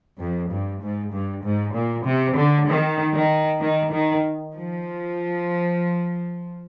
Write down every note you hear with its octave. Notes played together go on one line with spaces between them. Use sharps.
F2
G2
G#2
G2
G#2
A#2
C3
D3
D#3
D#3
D#3
D#3
F3